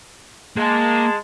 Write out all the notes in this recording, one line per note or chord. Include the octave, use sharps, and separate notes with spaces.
G#3 A#3 A5